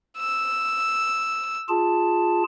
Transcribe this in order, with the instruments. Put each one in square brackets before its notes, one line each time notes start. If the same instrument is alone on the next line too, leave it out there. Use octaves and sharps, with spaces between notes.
[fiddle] E6
[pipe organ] F4 G#4 A5